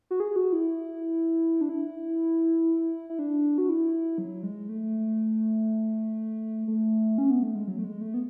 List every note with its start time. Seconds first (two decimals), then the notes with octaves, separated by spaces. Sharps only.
0.11 F#4
0.20 G#4
0.36 F#4
0.53 E4
1.61 D4
1.69 E4
3.10 E4
3.19 D4
3.58 F#4
3.69 E4
4.18 F#3
4.43 G#3
4.69 A3
6.68 A3
7.18 C#4
7.30 B3
7.43 A3
7.55 G#3
7.68 F#3
7.79 A3
7.84 G#3
8.01 A3
8.14 B3